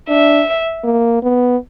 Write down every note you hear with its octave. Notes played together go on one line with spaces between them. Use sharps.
D4 E5
A#3
B3